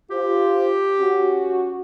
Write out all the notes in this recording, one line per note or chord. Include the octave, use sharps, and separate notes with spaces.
F4 G4 C5
C#4 F#4